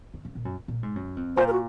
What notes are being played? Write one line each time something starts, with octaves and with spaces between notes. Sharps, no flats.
C#3
C#3
A#2
F#2
A#2
G#2
F#2
F2
A#2 C5
A#4
F#4